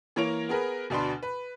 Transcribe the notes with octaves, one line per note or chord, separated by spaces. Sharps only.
E3 A#3 A#4 C#5 D7 F7
B3 G#4 A#4 B4
D2 B2 D4 B4 C6
B4